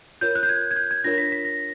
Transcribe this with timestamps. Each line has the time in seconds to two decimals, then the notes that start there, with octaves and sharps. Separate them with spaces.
0.21 F4 A#4 C#5 G6
0.35 F#6
0.43 G6
0.49 G#6
0.71 G#6
0.76 G6
0.91 G#6
1.04 D4 F4 A#4 C#5 A#6
1.18 B6
1.32 B6
1.45 A#6